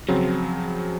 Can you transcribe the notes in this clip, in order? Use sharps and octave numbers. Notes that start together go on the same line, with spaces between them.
C#3 F3 F#3 C4